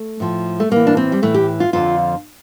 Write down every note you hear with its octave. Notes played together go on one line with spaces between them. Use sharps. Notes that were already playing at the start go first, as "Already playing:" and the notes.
Already playing: A3
A2 F3
A3
A2 E3 A#3
D4
C4
G3
A2 E3 A3
G4
F4
F2 D3 F3 F4